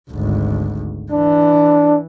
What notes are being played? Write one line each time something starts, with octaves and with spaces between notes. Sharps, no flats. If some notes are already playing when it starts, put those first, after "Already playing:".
G#1 D2
E3 D4